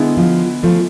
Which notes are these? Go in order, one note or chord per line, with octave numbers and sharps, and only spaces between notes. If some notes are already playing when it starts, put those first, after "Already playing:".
Already playing: D3 G#3 B3 E4
F3
F3 A3